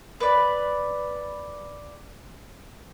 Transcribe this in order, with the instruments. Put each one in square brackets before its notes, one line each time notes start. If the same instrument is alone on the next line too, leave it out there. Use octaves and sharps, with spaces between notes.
[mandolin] B4 D5